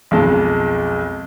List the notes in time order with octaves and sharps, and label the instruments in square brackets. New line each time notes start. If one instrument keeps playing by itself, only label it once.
[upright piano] B1 F2 G#3 A5